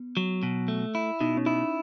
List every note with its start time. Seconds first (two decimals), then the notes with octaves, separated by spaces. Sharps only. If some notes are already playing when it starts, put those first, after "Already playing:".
Already playing: B3
0.17 F#3
0.43 B2
0.68 A3
0.95 E4
1.21 B2 D#4
1.37 C#4
1.46 D#4 E4